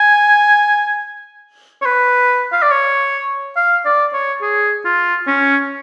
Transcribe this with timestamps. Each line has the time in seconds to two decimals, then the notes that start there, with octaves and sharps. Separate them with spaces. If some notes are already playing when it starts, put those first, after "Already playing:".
Already playing: G#5
1.82 C#5
1.86 B4
2.53 F5
2.62 D5
2.71 C#5
3.57 F5
3.85 D5
4.13 C#5
4.42 G#4
4.85 F4
5.27 C#4